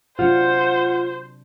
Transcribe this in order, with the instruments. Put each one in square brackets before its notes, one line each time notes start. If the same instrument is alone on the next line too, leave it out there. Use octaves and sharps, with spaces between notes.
[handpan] C3 F#3 D4 [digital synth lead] F4 [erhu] C5 [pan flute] F#5